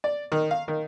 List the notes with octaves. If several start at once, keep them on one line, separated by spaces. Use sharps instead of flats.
D5
D#3
F5
D#3